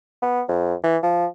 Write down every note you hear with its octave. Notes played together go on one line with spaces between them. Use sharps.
B3
F2
E3
F3